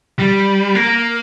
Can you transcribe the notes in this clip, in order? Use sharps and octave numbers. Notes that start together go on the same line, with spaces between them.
G3
A#3